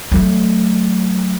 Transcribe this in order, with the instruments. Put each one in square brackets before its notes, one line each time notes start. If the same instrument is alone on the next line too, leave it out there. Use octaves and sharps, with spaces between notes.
[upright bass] F#3 A3